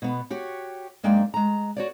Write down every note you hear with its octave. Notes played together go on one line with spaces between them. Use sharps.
B2 B3
F#4 G4 C#5
F#2 G#3 A#3 D4 G5
G#3 A#5
F#4 C#5 D5